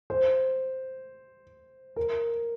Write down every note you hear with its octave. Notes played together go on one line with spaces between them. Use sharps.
C5
A#4